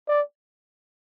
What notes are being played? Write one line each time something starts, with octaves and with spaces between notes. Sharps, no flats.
D5